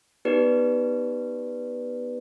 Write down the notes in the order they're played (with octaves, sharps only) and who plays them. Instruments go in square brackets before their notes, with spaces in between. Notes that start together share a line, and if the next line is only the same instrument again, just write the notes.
[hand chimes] B3 D#4 G4 B4 D5